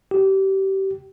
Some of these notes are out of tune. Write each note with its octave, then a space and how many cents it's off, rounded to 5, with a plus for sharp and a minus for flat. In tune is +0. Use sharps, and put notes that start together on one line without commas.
G4 -25